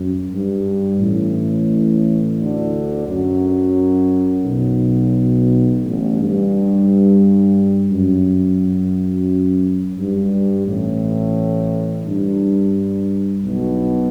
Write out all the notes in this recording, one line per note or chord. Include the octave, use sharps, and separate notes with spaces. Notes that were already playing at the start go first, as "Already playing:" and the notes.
Already playing: F#2
G2
A1 A2
D2 D3
F#2 F#3
B1 B2
A1 A2
G2
F#2
G2
A1 A2
G2
B1 B2